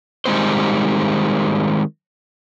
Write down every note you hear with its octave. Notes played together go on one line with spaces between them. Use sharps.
D#3 G3 G#3 B3 C4 C5